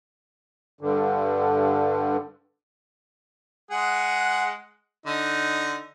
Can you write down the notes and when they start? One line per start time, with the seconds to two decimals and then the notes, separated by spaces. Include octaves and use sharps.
0.81 G2 D3
3.71 G#3 G#4 F#5
5.06 D3 D#4